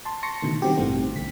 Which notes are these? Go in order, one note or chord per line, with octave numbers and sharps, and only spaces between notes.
A5 C6
A5 C6 C#6 A#6 C#7
B2 D3 D#3 A3
D#3 G3 C4 F#4 G4
A1 G2 B2 E3 A3 C4
B1 D3 B6